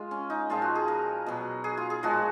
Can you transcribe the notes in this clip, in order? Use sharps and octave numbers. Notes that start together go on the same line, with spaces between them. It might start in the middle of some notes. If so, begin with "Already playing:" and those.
Already playing: G#3 F4
C#4
D#4
A#2 F3 G#3 F4
F#4
G#4
A#4
B2 F#3
G#4
F4
G#4
A#2 F3 G#3 F#4